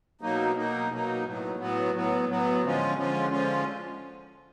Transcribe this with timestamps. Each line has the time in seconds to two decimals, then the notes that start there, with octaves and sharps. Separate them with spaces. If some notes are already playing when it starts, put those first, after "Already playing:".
0.21 B2 F#3 A#3 D#4
0.56 B2 F#3 A#3 D#4
0.91 B2 F#3 A#3 D#4
1.25 A2 F#3 B3
1.59 A2 F#3 B3
1.94 A2 F#3 B3
2.28 A2 F#3 B3
2.62 D3 F3 G#3 C#4 F4
2.97 D3 F3 G#3 C#4 F4
3.31 D3 F3 G#3 C#4 F4